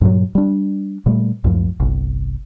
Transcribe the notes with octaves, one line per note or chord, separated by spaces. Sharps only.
G2 A#2 F#3
G3 D4
A#2 G3 A3
C#2 F#2 A2 F3
G1 C2